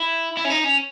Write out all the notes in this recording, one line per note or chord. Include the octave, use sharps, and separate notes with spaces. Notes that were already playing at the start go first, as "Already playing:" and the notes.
Already playing: E4
E4
C#4
D#4
C#4